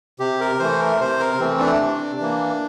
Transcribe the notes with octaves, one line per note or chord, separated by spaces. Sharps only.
C3 G4
A#4
E3 A3 C5
A#4
C3 C5
A#4
E3 A3 C4
D4
C3
E3 A#3